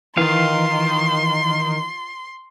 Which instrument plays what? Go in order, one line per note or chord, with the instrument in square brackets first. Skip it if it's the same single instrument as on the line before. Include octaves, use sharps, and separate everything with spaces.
[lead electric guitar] D#3 [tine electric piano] E3 [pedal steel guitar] F4 F5 [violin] C6